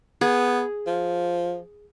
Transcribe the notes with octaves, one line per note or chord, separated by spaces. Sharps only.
B3 G#4
F3